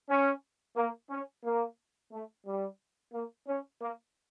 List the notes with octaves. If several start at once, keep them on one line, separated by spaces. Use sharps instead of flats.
C#4
A#3
C#4
A#3
A3
G3
A#3
C#4
A#3